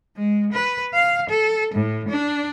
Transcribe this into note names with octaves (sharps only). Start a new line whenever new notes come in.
G#3
B4
F5
A4
A2
D4